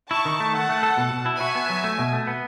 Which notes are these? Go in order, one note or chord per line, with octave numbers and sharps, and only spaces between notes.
E4 A5 C#6
D#3
A3
A4 F#5 A5
A3
A4
B2
B2
E4
F#4 E5 G#5
B3
F#3
A3
B2
A3
B3